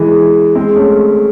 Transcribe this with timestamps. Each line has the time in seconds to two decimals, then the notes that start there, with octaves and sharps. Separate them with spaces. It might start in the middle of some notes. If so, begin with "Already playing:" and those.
Already playing: E3 G#3
0.55 G#3 C4
0.76 A3 C#4